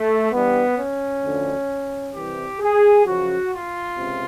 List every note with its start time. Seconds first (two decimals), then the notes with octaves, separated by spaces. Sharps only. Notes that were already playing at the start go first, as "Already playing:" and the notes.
Already playing: A3
0.32 G2 E3 G3 B3
0.78 C#4
1.23 D2 D3 F3
2.14 C2 C3 E3 G3 G4
2.60 G#4
3.05 F#2 C#3 F3 F#4
3.51 F4
3.97 C#2 C3